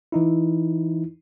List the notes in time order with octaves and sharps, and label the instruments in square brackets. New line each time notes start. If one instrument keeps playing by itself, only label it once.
[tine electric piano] E3 D#4 E4